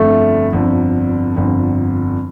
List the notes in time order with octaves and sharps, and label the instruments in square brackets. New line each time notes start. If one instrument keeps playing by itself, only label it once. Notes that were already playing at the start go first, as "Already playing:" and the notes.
Already playing: [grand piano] G1 F2 D3 [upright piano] A3
[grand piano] G1 F2 D3
G1 F2 D3